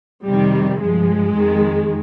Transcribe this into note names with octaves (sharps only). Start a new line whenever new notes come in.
F2 C3 D#3 G3
G2 F3 G#3
F2 D#3